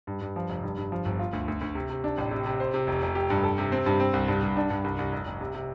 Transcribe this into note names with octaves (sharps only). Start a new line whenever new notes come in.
G2
G2
F3
F1
G2
G2
F3
G1
F4
D2
D2
D2
C3
C3
D4
A1
C3
C3
C5
C3
F1
F1
G4
G2
A4
C3
C4
G2
C4
C2
G2
G2
D4
G2
C2
C2
F1
F1
C3
C3